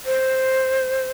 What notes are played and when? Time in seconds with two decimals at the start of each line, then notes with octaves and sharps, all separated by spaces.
0.06 C5